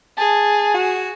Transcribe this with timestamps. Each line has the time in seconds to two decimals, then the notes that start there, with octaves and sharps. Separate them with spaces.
0.18 G#4 A5
0.74 F#4